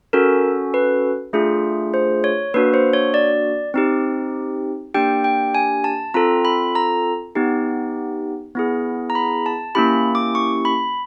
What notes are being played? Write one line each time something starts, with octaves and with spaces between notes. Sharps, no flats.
C#4 F#4 A4 A#4
B4
A3 D4 F4 G#4
C5
C#5
A#3 D4 F#4 B4
C5
C#5
D5
C4 D#4 G4
A#3 D4 G4 G5
G5
G#5
A5
C4 F4 A4 A#5
B5
A#5
B3 D#4 G4
B3 E4 G#4
A#5
B5
A5
A#3 C#4 E4 G4 B5
D6
C#6
B5